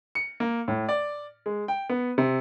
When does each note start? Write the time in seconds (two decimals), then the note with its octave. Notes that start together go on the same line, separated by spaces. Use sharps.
0.15 C#7
0.40 A#3
0.68 A2
0.89 D5
1.46 G#3
1.68 G5
1.89 B3
2.18 C3